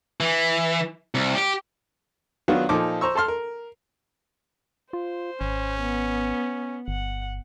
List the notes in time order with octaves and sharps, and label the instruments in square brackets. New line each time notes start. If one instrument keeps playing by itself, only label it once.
[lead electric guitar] E3
C2
G4
[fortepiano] D#3 F#3 B3 D4 F4 F#4
A#2 F3 D#4 A4 D6
C5 A#5 C#6 E6
A4 A5 C6 F6
A#4
[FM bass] F4 [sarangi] C5
[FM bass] G#1 [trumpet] C#4
[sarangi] B3
[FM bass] G1 [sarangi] F#5